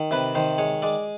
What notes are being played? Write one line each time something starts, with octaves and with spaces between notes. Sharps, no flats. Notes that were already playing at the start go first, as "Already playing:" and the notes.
Already playing: D#3
C3 B4
D#3 C5
G#3 C#5
G#3 D5